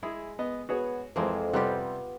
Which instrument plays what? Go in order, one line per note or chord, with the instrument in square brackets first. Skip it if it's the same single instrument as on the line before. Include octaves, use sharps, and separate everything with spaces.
[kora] G#3 [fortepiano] E4 G#4
[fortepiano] B3 D#5
[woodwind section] B3 [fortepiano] F#4 G#4 C#5
[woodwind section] F2 [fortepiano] E3 F3 G#3 [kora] A#3 C4
[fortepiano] C3 G3 [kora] B3 F4 G4